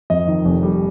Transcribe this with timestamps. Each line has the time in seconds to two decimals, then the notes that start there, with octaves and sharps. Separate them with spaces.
0.10 F2 D#5
0.27 D#3
0.45 F1
0.63 G3